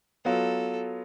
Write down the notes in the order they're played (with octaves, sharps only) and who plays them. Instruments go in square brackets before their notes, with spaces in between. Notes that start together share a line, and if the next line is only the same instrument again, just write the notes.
[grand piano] F#3 B3 F4 [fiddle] A4